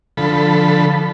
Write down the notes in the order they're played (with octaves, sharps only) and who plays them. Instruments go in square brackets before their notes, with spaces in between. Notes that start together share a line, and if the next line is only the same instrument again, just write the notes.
[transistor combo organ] D3 F3 A4 B5